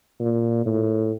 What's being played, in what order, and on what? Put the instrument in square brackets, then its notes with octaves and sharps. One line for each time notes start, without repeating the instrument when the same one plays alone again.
[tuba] A#2
A2